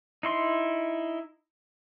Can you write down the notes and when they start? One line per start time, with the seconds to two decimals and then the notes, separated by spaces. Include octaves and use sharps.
0.23 D#4 E4 C6